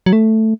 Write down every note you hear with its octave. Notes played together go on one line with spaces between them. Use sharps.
F#3
A3